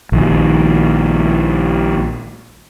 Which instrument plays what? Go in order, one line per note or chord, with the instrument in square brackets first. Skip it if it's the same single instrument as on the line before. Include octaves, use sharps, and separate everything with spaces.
[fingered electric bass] A#1 D#3